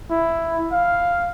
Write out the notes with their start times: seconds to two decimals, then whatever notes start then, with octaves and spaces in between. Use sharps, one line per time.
0.11 E4
0.72 F5